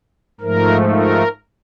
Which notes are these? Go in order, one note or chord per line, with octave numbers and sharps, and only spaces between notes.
G#2 F3 A3 A#4
A#4